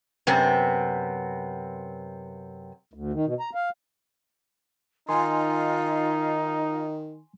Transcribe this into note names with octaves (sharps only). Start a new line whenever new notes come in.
F#2 C3 B3 C4
D2
D#3
B2
A#5
F5
D#3 D#4 F4 G#5 C6